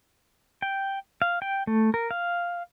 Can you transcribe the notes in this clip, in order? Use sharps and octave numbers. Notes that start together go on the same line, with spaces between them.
G5
F5
G5
A3
A#4
F5